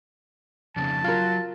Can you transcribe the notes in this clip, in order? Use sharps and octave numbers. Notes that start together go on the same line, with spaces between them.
F2 C#3 A5
F#3 F4 A#4